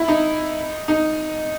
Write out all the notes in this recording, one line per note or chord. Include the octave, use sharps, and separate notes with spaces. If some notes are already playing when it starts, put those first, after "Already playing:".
Already playing: E4
D#4
D#4